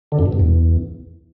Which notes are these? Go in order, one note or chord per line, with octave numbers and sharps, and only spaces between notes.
D3
F#2
B2
G2
E2